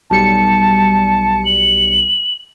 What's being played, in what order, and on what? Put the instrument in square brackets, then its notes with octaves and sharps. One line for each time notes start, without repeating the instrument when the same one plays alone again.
[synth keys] B1 G3 C#7 [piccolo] A5
[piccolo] F#7